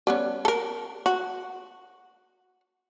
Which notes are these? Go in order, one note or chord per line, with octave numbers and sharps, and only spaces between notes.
G3 B3 C#4
A4 A#4
F#4